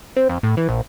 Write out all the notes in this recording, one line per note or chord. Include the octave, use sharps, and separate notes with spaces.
C4
F2
A2
E3
A#1